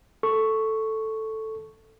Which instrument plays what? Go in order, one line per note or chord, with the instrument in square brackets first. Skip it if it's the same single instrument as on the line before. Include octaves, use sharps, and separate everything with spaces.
[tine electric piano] A4 C#6